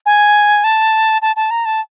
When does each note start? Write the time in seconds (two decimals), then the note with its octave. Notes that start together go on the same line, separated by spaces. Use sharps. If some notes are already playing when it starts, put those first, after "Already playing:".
0.06 G#5
0.64 A5
1.22 A5
1.36 A5
1.51 A#5
1.65 A5